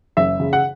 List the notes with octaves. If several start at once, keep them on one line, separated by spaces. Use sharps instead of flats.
F#1 E5
C#3
F#5